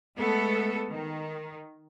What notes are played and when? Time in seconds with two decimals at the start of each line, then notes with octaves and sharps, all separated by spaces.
0.17 G#3 A3 B3 A4
0.90 D#3